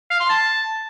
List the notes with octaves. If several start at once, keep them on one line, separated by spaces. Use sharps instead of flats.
F5
C6
A5